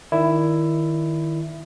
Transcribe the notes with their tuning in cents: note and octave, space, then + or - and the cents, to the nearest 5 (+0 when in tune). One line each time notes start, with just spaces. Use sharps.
D#3 +0 E4 +10 D5 +0